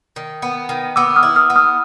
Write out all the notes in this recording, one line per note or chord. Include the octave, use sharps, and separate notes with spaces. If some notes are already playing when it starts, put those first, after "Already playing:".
D#3
B3
D#3
B3 D6 E6
D#6 F6
E4
D#6 F6
B3
D#6 F6